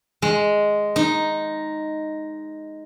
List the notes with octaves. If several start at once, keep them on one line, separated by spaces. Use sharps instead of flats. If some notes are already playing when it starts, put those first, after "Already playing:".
G#3
D#4